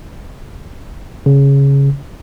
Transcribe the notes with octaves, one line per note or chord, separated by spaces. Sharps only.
C#3